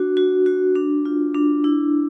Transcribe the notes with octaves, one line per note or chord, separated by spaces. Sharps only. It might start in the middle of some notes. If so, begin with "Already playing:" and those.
Already playing: D4 F#4
F#4
F#4
D4
F4
D4
E4